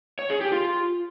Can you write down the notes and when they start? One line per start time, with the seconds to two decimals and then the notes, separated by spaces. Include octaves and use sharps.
0.19 C#5
0.30 G#4
0.41 G4
0.52 F4